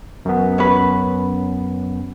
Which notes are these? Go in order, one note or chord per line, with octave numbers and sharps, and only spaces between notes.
F#2 B3
C#4 B4